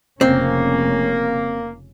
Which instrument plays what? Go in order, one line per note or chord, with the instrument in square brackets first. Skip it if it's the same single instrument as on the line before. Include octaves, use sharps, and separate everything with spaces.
[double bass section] F1 C#3 C#4 [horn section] A#3 [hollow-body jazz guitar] C4